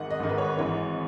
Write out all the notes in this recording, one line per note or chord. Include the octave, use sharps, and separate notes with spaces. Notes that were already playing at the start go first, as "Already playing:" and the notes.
Already playing: G#1 G#2 D#3 F#5
D#5
G#1 G#2 D#3
B4
C#5
B4
G#1 G#2 E3 C#5